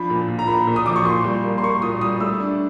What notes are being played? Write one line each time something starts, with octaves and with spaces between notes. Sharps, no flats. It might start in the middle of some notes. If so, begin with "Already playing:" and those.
Already playing: F3 D4 B5
A#2
A#2
A#5
A#2 B5
A#2
D#6
F3 D6
C#6
A#2 C6
G3
A#3
C6
A#3 C#6
A#2 D#6
G3 D#6
A3 E6
D4